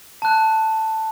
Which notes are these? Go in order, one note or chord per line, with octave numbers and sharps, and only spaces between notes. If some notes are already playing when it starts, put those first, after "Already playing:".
A5 F#6